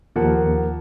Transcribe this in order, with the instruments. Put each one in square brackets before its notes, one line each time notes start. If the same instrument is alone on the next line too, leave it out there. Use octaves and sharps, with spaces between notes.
[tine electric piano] D#2 F#5 [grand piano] F3 A#3